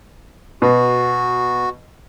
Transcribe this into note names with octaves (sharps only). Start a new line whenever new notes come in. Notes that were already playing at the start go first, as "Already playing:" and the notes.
B2 F#4